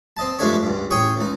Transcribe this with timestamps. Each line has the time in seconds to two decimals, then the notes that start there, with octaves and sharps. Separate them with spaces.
0.17 C4 D#5 A5
0.39 G2 F3 G#3 A3 D4 C#5
0.63 C#2 G2
0.91 A1 G#4 C#5 G5 C#6 D#6
1.17 C#2 D#4